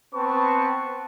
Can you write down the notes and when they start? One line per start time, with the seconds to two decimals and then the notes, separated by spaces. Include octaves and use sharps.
0.15 B3 C4 B4 A5 C#6